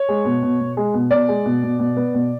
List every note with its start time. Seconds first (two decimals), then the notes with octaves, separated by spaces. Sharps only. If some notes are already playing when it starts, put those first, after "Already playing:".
Already playing: C#5
0.09 G#3
0.25 B2
0.43 B2
0.60 B2
0.77 G#3
0.94 B2
1.11 B2 D5
1.29 G#3
1.46 B2
1.63 B2
1.79 B2
1.97 B3
2.14 B2